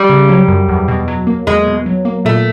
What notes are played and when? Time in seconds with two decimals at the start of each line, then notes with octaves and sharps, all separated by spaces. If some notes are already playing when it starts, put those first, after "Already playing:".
Already playing: G3
0.10 C#3
0.29 F#3
0.48 F#2
0.69 E2
0.88 B2
1.08 F#3
1.27 A#3
1.47 E2 G#3
1.67 B2
1.86 F#3
2.05 A#3
2.25 A#2 A3